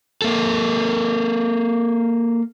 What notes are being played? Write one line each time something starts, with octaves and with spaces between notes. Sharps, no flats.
A#3 A4